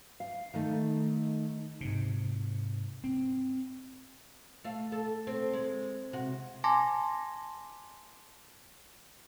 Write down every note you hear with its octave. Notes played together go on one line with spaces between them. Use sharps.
F5
D#3 A3 D#4
G#2 C3
C4
A3 F5
A4
C4
G#3
C3 F#4
G#5 A5 C6 D6 G#6 A#6